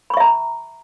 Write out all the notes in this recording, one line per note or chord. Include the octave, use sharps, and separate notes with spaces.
E5 A#5 B5 C#6